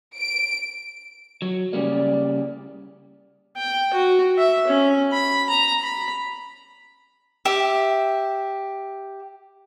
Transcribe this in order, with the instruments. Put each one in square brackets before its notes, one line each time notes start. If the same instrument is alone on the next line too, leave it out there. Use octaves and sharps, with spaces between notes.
[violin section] D7
[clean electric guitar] F#3
[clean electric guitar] C#3 G3 A#3 [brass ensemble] D5
[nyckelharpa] G5
F#4
E5
C#4
B5
A#5
B5
[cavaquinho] G4 E5